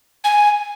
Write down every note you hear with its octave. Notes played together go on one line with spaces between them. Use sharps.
G#5